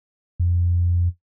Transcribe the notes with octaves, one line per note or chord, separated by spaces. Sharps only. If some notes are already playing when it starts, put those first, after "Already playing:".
F2